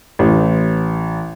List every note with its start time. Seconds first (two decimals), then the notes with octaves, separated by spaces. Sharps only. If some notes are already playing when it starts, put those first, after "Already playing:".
0.19 A1